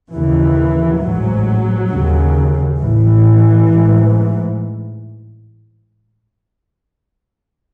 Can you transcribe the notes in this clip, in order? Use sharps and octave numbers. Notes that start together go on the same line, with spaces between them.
D#2 C#3 E3
A1 G#2 F#3
D#2 C#3
A1 A2 E3
A1 G#2